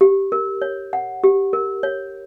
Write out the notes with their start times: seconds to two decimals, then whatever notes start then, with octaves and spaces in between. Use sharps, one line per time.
0.01 G4
0.32 A#4
0.62 C#5
0.93 F#5
1.24 G4
1.53 A#4
1.83 C#5